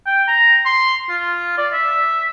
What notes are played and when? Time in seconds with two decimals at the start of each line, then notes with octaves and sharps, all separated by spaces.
0.06 G5
0.28 A#5
0.65 C6
1.09 F4
1.57 D5
1.73 E5